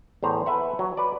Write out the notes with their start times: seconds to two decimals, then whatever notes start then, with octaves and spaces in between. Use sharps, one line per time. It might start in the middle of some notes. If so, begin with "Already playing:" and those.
0.23 E2 A2 C5 A#5
0.46 A4 B4 E5 F#5
0.79 F#3
0.97 B4 D5